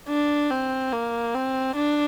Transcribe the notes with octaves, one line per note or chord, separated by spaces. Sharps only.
D4
C4
A#3
C4
D4